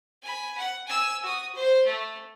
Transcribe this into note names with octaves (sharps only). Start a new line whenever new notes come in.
G#5 B5
F#5
G#5 E6
F#4 D#6
C5
A3